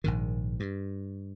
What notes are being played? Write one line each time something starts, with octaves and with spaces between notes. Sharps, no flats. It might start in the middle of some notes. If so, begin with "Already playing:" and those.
A#1 G#2 D#3
G2